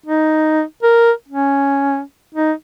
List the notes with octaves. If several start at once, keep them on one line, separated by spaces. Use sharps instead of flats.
D#4
A#4
C#4
D#4